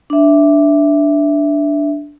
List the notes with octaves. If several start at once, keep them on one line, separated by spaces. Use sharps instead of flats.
D4 E5